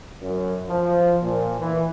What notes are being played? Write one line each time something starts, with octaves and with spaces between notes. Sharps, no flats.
F#2
F3
A#2
E3